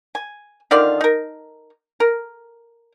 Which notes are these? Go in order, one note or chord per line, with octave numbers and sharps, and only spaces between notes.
G#5
D3 D#3 F4 D5
D#4 A#4
A#4